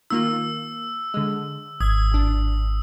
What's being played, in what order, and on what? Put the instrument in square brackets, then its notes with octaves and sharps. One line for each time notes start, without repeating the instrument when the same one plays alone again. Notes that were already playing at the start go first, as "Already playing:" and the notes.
[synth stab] D#3 A#3 F4 [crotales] E6
[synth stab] D3 G#3
[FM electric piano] G#1 [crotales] D#6 [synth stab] G#6
[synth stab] A1 D4